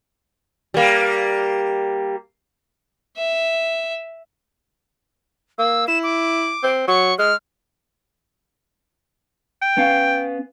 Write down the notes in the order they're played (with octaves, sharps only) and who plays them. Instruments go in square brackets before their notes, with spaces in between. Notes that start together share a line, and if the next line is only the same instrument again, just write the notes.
[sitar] G3 A#3
[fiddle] E5
[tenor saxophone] A#3 [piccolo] E6
[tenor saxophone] E4 [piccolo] E7
[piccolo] D6
[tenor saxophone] C4
[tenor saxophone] F#3 [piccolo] C#6
[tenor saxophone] G#3 [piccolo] F6
[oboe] G5
[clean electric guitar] B3 C#4 F5